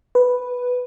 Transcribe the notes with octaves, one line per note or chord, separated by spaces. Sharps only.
B4